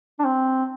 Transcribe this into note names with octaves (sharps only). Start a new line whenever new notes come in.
D4
C4